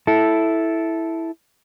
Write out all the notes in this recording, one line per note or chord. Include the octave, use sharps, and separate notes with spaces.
E4 A4